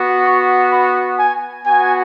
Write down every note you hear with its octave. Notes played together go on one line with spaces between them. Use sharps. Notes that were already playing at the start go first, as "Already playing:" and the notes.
Already playing: B3 F#4
C#6
B5
G#5
B3 F#4 G#5